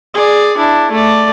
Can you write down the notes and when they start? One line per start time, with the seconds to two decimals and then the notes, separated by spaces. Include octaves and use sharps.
0.14 G#4 D5
0.57 D4 E4
0.91 A3 D5